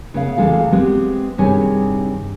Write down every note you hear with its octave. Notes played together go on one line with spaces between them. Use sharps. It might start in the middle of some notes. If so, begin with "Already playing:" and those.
C#3 B3 F5
E2 C3 G#3 A4 F5
G#3 B3 C4 G4
G2 C3 D#3 G#4 C#5 G#5